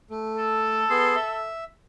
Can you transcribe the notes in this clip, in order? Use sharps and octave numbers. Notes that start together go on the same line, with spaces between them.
A3
A4
B3 G#4 C6
E5